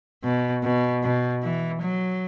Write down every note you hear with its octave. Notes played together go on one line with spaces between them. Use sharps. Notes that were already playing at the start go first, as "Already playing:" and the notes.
B2
B2
B2
E3
F#3